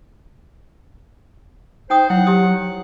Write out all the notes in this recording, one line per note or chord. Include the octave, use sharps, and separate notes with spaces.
D#4 C5 G5 D#6
F#3 E4 F#5
E4 G4 D#6